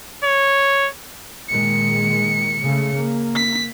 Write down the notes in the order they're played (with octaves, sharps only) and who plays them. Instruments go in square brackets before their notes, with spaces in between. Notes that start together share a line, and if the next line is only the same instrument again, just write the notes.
[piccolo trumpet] C#5
[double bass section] A#2 D#3 G#3 [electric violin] C#7
[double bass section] C#3 A3
A#3
[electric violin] B6